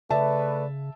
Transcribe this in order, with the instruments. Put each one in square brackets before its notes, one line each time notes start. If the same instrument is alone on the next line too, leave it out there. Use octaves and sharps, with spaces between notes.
[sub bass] C#3 [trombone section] A3 B4 [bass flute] D5 [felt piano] E5 A5